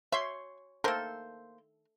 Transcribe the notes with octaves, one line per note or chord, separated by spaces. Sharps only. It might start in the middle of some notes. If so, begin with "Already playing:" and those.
C#5 E5 C6
D#3 A#3 A4 A#4 C5